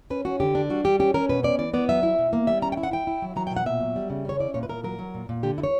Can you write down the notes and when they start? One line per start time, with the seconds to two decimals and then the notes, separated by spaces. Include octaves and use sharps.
0.10 C#4 B4
0.25 C#4 F#4
0.40 D3 G4
0.55 D4
0.70 G3 F#4
0.84 G3 G4
0.99 C#4 G4
1.14 C#4 A#4
1.29 B2 B4
1.43 C#4 D5
1.59 E3 D5
1.74 B3 D5
1.89 F#3 E5
2.03 E4
2.19 B2
2.33 A#3
2.47 G3 E5
2.62 C#4 A#5
2.72 G5
2.77 E4
2.83 F#5
2.91 E4 G5
3.07 E4
3.22 F#3
3.36 F#3 A#5
3.47 G5
3.51 B2
3.57 F#5
3.66 A#2 E5
3.81 F#3
3.96 G3
4.10 C#3
4.25 C#4 C#5
4.39 E4 D5
4.54 A#2 C#5
4.63 B4
4.69 A#2 A#4
4.84 F#3 A#4
4.99 F#3
5.14 A#2
5.29 A#2
5.43 D3 G4
5.58 E4
5.63 C#5